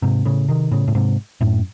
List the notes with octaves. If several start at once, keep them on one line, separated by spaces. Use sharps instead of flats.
G#2 C3
A2 C#3
C3 D#3
A2 C#3
A2
G#2 C3
F#2 A2